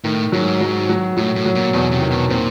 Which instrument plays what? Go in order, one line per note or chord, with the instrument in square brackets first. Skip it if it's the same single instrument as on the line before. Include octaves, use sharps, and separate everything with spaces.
[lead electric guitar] A2 [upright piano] D#3
[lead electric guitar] G#2 [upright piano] F#3
[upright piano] F#3
F#3
[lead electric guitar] A2 [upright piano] F#3
[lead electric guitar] A2
[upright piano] F#3
[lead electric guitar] A#2
[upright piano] E2 [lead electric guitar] B2
[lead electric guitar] C3
[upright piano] D#3
[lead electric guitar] B2
[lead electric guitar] A#2 [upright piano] C4